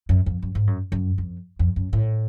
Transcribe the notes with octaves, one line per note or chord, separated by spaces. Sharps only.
F#2
F2
F#2
G#2
F#2
F#2
F2
F2
F#2
A2